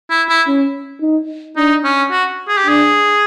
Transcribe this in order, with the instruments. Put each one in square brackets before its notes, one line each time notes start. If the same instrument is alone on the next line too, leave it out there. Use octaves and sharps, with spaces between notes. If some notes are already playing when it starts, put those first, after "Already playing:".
[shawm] E4
E4
[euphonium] C#4
D#4
[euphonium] D4 [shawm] D#4
[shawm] C#4
F#4
G#4
G4
[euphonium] D4 [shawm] G#4